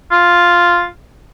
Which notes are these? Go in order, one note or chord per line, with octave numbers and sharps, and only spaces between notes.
F4